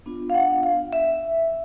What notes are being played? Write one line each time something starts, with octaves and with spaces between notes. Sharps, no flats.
B3 D4 F4
F5
F#5
F5
E5